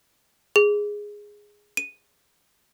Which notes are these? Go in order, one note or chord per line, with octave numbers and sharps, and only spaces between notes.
G#4
D#7